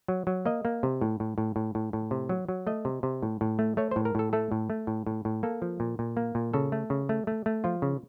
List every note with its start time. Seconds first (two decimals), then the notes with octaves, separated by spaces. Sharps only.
0.08 F#3
0.27 F#3
0.46 A#3 D#5
0.65 A#3
0.83 C3
1.01 A2
1.20 A2
1.38 A2
1.56 A2
1.75 A2
1.93 A2
2.11 C3
2.29 F#3
2.49 F#3
2.67 A3 D#5
2.85 C3
3.03 C3
3.23 A2
3.41 A2
3.59 A3
3.77 A3 C#5
3.91 C5
3.96 A2
4.05 A#4
4.15 A2 A4
4.33 A3 A4
4.52 A2
4.70 A3
4.87 A2
5.06 A2
5.25 A2
5.43 A#3 A4
5.62 F3
5.80 A#2
5.99 A#2
6.17 A#3
6.35 A#2
6.53 C#3 A4
6.72 A3
6.90 C#3
7.09 A3
7.27 A3
7.46 A3
7.64 F3 F4
7.82 C#3